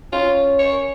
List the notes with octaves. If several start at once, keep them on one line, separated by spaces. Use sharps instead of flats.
C#4 F4
C#5